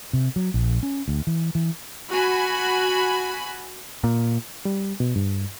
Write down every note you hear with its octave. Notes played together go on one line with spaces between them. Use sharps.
C3
F#3
A#1
C#4
D2
E3
E3
F#4 G#5 B5
A#2
G3
B2
G2